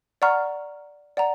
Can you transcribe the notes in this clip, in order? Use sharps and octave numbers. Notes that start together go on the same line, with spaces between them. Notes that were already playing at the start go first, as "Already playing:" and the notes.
D5 F#5 A#5 C#6 F6
D5 F#5 A#5